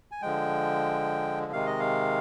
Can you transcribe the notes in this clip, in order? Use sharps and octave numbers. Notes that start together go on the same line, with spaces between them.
G#5
D3 F3 G#3 G5
C3 D#3 G#3 F5
D#5
F5